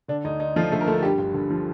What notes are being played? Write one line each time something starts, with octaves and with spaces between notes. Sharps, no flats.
D3 D4
D2 D#4
D4 D#4
F3 A3 F4
D3 A3 A4
A#4
D2 A3 A4
A4
G2 G3 G4
G1
G1
F3